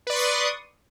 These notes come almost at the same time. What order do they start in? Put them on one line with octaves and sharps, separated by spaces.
B4 D5 C6 C#6 D#6